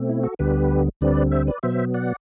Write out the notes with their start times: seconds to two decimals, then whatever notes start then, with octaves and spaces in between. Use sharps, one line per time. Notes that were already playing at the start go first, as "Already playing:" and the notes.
Already playing: B2 A3 C4
0.09 E4
0.23 F#4 A4
0.39 D2 D3 G3 B3 G4 B4
1.01 D2 D3 G3 C4 B4 D5
1.31 C5 E5
1.47 B4 D5
1.63 B2 F#3 B3 C5 E5
1.94 D5 F#5